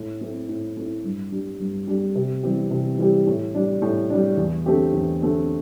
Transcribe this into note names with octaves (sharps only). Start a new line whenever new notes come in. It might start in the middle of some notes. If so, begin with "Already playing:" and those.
Already playing: A2
A3 C4 E4
A2
A3 C4 E4
G2
G3 D4
G2
G3 D4
C3
E3 G3 C4 G4
C3
E3 G3 C4 G4
A2
G3 D4
A2
G3 D4
E2
D3 A3 C4 G4
E2
D3 A3 C4 G4